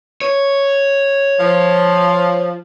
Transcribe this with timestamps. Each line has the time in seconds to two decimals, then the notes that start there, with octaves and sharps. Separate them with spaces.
0.21 C#5
1.39 F3